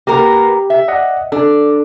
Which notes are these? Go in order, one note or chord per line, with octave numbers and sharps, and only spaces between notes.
A#3 B3 G4 A#4
E5
D5 D#5 F#5
D4 A4